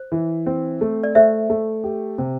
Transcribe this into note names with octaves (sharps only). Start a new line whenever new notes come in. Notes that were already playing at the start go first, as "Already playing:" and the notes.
Already playing: C5
E3
C4
A3
D5
A3 C5 E5
A3
G4
C3